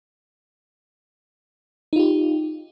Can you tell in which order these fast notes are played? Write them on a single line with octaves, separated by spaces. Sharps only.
D#4 F4 G4